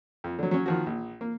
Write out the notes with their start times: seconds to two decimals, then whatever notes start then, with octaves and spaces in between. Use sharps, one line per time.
0.24 F2
0.39 D3 F#3
0.51 F#3 C#4
0.66 D#3 F3 F#4
0.86 A#1
1.21 A#3